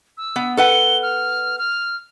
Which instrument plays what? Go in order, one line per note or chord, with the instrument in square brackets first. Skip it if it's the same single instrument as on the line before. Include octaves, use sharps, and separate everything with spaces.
[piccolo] E6
[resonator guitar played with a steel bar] B3
[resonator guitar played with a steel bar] A4 B4 F#5 [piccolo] G7
[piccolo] F6
F6